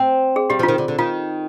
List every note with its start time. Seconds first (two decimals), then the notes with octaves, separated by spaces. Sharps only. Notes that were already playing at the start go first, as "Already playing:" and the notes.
Already playing: C4
0.36 G#4
0.50 G3 G4
0.59 F3
0.63 F4
0.68 D#3
0.78 D3
0.88 D3
0.99 D#3 F4